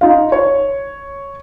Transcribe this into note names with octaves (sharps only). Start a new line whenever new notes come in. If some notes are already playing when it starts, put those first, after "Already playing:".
D#4 F4 F5
C#5